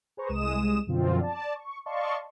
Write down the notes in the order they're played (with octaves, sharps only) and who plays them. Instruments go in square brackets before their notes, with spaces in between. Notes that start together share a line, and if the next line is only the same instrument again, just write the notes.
[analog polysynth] G#4 B4 C5 A#5 C#6
C2 G#3 D#6 E7
F#2 B2 D3 F3 C4 F4
D5 A5
C#6
D5 D#5 F5 A5 C6 C#6